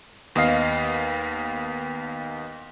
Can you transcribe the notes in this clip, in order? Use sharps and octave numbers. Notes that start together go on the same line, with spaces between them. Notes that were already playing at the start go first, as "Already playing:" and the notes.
D#2 B3 D#5 F5 C7